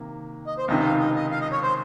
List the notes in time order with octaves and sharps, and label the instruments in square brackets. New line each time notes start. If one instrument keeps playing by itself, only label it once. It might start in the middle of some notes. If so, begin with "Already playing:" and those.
Already playing: [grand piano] C3 D#3 A#3
[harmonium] D#5
C5
[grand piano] C#2 C3 D#3 [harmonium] D#5
[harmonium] F5
D#5
D#5
F5
D#5
C#5
C5